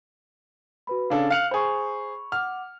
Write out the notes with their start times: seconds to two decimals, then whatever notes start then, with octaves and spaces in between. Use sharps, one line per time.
0.87 F#4 B4 B5
1.10 C#3 D4 A4 F5
1.30 F5 F6 F#6 C#7 F7 F#7
1.51 G#4 C5 B5 C#6
2.32 F#5 D6 F6